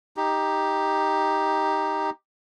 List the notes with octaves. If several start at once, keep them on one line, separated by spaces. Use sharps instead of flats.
D#4 G4